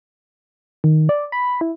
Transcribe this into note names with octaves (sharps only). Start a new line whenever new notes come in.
D#3
D5
B5
E4